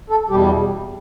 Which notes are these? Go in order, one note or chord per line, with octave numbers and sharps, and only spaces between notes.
A4
E2 B2 G3 G4